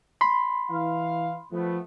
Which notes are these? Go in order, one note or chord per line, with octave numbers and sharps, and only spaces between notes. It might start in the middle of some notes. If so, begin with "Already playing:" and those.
B5 C6
E3 F5
F3 A3 B3